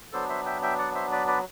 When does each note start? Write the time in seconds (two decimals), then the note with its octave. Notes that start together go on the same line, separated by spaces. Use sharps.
0.13 F#3 B3 D4 A4 C5
0.29 C5 E5
0.46 E5 G5
0.63 E5 G5
0.78 D5 F#5
0.95 C5 E5
1.12 B4 D5
1.27 B4 D5